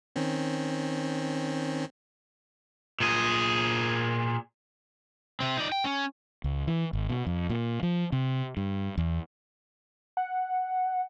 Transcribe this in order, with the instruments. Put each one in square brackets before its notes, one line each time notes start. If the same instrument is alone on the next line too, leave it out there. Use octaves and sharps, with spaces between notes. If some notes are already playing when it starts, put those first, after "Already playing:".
[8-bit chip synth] D#3 C4 C#4
[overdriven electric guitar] A#2 G#4
C3 C4
D#4 D5
G5
C#4
[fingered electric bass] C#2
E3
G#1
B2
F2
A#2
F3
C3
G2
E2
[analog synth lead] F#5